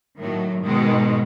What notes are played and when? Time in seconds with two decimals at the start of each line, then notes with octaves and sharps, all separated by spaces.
0.20 A2 D#3 F#3 A3
0.63 G#2 B2 D#3 G#3